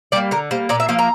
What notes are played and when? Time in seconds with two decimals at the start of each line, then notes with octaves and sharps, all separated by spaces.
0.12 G3 A#3 D5
0.31 D3 A#4
0.51 G3 A#3 C5
0.69 A#2 D5
0.80 E5
0.88 F3 A#3 F5
0.99 A#5